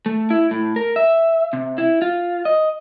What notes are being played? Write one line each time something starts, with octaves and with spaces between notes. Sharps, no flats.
A3
E4
A2
A#4
E5
C3
E4
F4
D#5